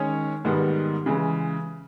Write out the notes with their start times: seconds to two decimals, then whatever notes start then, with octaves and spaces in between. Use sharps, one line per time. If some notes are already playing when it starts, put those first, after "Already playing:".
Already playing: D#3 G#3 C#4 G#4 C#5
0.45 G#2 D#3 G3 B3
1.06 C#3 E3 G#3